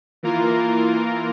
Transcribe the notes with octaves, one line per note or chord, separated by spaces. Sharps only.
E3 A#3 F4 A#4